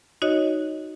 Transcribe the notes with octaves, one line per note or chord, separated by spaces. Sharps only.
D#4 F#4 C#5 D#5